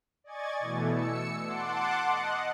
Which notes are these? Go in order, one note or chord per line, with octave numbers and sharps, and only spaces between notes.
D5 D#5 G#5 C#6 G#6 A6
B2 E3 A3
E6 C#7
F#5 A5 C6 D6
D#5 F#5